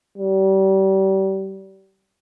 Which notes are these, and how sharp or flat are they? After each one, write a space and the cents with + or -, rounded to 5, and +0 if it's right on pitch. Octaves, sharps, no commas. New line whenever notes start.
G3 -30